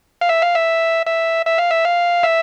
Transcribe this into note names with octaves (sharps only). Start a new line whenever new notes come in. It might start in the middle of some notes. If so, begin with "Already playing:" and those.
F5
E5
F5
E5
E5
E5
F5
E5
F5
E5